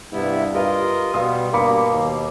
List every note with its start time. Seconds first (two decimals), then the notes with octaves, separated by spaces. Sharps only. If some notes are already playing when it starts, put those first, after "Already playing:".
0.13 G2 C3 B3 E4
0.54 F4 G4 A#4 B4 D#5 F5
1.14 B2 G3 B3 F5 C6 D#6
1.53 G2 B2 A#3 B5 D6 C#7
1.92 D#2